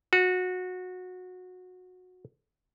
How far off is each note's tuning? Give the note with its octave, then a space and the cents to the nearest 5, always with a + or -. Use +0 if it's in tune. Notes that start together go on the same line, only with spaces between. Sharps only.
F#4 -20